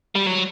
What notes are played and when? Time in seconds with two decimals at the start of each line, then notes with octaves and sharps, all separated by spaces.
0.16 G3
0.27 F#3